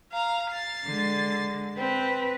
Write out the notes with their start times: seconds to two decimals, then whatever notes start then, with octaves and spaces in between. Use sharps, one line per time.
0.12 F5 A#5
0.50 A6 C7
0.86 D3 G#3
1.78 C4 B4